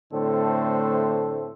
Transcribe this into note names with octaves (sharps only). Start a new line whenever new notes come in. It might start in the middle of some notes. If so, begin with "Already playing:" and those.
A2 D3 A3 C4 A4 C5